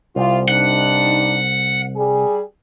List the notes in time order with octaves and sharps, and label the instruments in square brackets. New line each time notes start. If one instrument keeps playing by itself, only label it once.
[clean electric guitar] C2 [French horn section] C4 E4 F4
[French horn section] G2 D4 D#4 [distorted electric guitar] F#5
[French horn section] G3 G#4